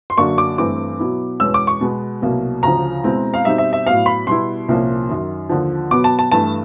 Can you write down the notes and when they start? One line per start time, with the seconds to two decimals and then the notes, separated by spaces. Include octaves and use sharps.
0.10 C6
0.17 F#2 D3 F#3 A#3 D4 C#6
0.38 D6
0.58 G2 E3 A3 C4 D6
0.99 B2 F#3 B3 E4
1.40 E2 B2 G#3 C#4 E6
1.54 D6
1.67 C#6
1.81 B2 G#3 B3
2.22 C2 B2 F#3 A#3
2.63 D2 C#3 F3 A#5
3.04 B2 G#3 C4 E4
3.34 F5
3.45 B2 G3 C4 D#4 E5
3.58 E5
3.73 E5
3.86 A2 F#3 B3 F5
4.06 B5
4.27 B2 G3 B3 E4 C6
4.69 C2 A#2 F3 A#3 C#4
5.09 F#2 D#3 F#3
5.49 D#2 D3 F3
5.91 B2 F#3 B3 D6
6.04 A5
6.19 A5
6.32 G2 E3 A3 A5